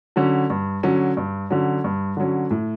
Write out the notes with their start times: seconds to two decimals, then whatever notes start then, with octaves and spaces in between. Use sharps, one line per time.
0.16 D3 F#3 C#4
0.50 G2
0.83 D3 F#3 C#4
1.17 G2
1.50 D3 F#3 C#4
1.84 G2
2.17 D3 F#3 C#4
2.51 A2